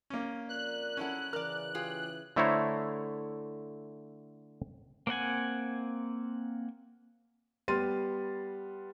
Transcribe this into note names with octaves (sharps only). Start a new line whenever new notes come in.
A#3 C#4
F2 A#4 D5 F#6
F#3 C#4 E4 A4 F#5
C#3 E3 A#4 D5 F6
F4 G4 G#4
D3 A3 E4 C5 C#5 A#5
A#3 C4 F#5 G#5
G3 B3 C6 F6 A6 D#7